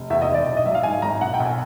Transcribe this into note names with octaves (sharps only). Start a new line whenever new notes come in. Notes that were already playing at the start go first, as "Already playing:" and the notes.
Already playing: F1
E2 E5
D#5
D#3
D5
B1
D#5
F#3 E5
F5
G#2 G#5
G#1 A#5
B1 F#5
G5
B1
G#5